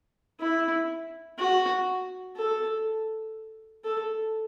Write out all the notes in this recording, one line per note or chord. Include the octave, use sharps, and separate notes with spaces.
E4
F#4
A4
A4